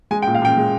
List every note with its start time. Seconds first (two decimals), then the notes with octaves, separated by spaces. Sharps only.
0.11 G#3 G#5
0.22 G5
0.27 A#2
0.35 F5
0.42 A#2 G5
0.57 G#3